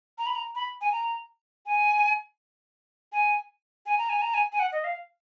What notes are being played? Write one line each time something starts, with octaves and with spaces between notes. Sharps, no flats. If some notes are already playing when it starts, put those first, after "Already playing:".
A#5
B5
A#5
B5
G#5
A#5
G#5
G#5
G#5
A#5
G#5
A#5
G#5
G#5
F#5
D#5
F5